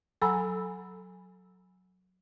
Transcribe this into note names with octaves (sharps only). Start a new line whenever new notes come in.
F#3 A4 G#5 A#5 B5 E6